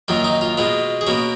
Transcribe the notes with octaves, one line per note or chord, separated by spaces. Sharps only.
F#2 D#3 F#3 A#3 F4
D#4
F4
B2 G#3 B3 F4
G#4
B2 A#3 C#4 F#4